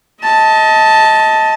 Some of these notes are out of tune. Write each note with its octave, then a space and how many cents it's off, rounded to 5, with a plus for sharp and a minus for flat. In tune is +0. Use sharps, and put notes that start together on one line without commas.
D#5 +30 A5 +0